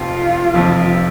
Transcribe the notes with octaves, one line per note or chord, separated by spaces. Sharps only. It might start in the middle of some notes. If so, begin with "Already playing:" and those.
Already playing: F1 F2 F3 F4
F1 F2 F3